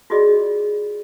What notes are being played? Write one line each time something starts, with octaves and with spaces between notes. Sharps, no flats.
F4 F#4 G#4 D5 D#5